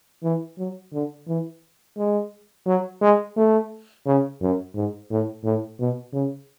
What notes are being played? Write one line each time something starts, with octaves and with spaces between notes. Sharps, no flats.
E3
F#3
D3
E3
G#3
F#3
G#3
A3
C#3
F#2
G#2
A2
A2
B2
C#3